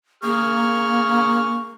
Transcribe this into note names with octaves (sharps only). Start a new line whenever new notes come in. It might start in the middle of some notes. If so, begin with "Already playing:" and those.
A#3 G#4 C#6 F6